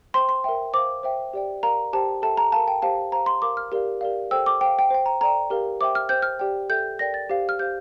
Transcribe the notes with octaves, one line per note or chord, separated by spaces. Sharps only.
C5 G5 C6
C6
A#4 E5 G5
C5 F5 D6
C5 E5 G5
G4 D5 G5
A#4 D5 F5 A#5
G4 C5 G5 A5
A4 E5 G5 A5
A#5
A#4 F5 A5
G5
G4 C5 F5 A5
C5 F5 A#5
C6
A#4 F5 D6
F6
G4 A#4 D5 F5
G4 A#4 D5 F5
A4 C5 G5 E6
D6
C5 F5 G5
G5
C5 G5
A#5
A4 D5 G5 A#5
G4 A#4 F5
C5 E5 G5 D6
F6
C5 G5 G6
F6
G4 D5 G5
A4 E5 G5 G6
A#4 D5 G5 A#6
A6
G4 C5 F5
F6
G4 C5 F5 G6